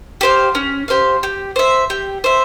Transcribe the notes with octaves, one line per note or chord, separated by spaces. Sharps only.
G4 C5 F5
C#4
G4 C5 F5
G4
C5 E5
G4
C5 E5